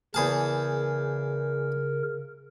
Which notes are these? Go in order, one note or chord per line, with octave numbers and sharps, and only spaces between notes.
E2 C#3 G#4 A#4 A5